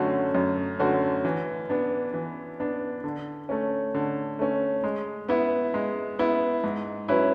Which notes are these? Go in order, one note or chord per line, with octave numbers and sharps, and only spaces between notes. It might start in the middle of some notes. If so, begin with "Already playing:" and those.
Already playing: F#2 D3 A3 C#4 F#4
F#2
D3 A3 C#4 F#4
E3
B3 D4
E3
B3 D4
D3
A3 C#4
D3
A3 C#4
G#3
B3 E4
G#3
B3 E4
G#2
F#3 C#4 E4 B4